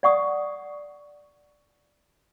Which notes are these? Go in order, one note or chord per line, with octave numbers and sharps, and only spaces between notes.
D5 F#5 C#6 D#6